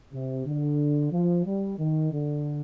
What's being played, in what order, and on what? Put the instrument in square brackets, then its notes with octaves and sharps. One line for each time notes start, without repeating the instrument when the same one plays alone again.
[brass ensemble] C3
D3
F3
G3
D#3
D3